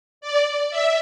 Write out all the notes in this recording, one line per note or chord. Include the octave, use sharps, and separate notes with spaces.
D5
E5